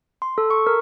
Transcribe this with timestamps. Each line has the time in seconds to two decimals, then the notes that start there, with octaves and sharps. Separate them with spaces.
0.22 C6
0.38 A4
0.51 C#6
0.67 A#4